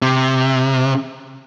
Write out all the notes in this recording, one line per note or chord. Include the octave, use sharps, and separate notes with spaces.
C3